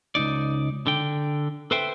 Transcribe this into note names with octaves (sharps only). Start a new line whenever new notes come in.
C#2 G2 D#4 D5
D3 G5
A4 B4 C5 E5 G5